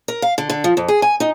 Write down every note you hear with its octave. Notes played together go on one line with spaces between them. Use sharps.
A#4
F5
D3
D3
F3
F2
G#4
G#5
D#4